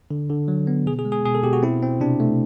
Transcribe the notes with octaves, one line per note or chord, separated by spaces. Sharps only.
D3
D3
F#3
B3
B2 G#4
G#4
G#3
G#4
B2 G#4
A4
B2 G4
F#4
C4 E4
C4
C3 D4
A3